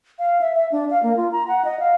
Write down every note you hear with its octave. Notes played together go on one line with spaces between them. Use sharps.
F5
E5
E5
D4
F5
A#3
F4
A#5
F#5
D#5
F5